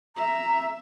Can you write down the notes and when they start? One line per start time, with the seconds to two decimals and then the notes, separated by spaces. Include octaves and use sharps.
0.16 E5 A#5